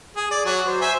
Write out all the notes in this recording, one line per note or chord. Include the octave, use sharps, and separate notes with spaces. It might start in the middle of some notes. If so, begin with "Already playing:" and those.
G#4
D5
F#3 F#4
C5
C5 E5 G#5